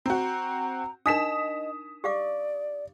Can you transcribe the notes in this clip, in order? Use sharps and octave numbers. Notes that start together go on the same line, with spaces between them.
C4 F#4 A#5
D4 D#4 A#4 D#5 D#6 B6 E7
G4 D5 F5 D6